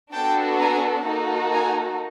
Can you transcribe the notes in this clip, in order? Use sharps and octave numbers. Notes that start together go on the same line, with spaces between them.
B3 D4 F#4 A4 G5 A5
G#5 A#5
A#3 D#4 F#4 A4
G#5 A#5